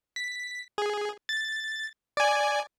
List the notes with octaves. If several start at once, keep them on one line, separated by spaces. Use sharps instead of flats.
B6
G#4
A6
D5 G#5